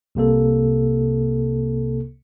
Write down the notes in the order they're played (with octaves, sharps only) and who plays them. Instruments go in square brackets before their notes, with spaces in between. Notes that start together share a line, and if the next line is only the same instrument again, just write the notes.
[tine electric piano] C2 C3 A#3 A4